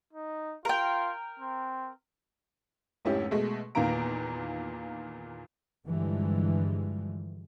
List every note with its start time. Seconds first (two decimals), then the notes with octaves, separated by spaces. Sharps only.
0.13 D#4
0.65 F4 A#4 G5
1.39 C4
3.05 F1 G#2 C#4 E4 G4
3.31 B2 G#3 A3
3.75 E2 A#2 D#3 A#3 A#5 D7
5.87 G2 D3 E3 F3 G3 G#3